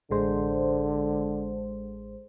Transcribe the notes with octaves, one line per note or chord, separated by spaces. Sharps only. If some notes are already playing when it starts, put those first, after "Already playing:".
A1 D3 G#3 C5